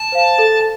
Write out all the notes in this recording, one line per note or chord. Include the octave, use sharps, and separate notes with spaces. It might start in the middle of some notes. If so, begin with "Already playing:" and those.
Already playing: A5
C5 F5
A4